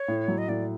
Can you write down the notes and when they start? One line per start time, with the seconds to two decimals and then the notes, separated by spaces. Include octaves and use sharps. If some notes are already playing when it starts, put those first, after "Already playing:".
Already playing: C#5
0.08 A2
0.28 F#3
0.38 D#5
0.48 A2 D5